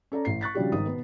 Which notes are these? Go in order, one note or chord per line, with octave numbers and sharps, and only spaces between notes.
C#4 A4 D5 A#5
A1 C7
C#6 F#6 A6 B6
C#3 F3 G3 D4 F#4 G4
G#1 D#3 D#6
B2 B3